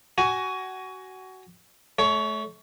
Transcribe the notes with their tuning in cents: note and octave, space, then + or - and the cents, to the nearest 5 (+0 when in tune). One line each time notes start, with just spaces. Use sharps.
F#4 +20 G#5 +0
A3 -30 C#5 +20